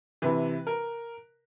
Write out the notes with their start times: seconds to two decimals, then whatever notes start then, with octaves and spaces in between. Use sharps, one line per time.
0.22 C3 E3 B4
0.67 A#4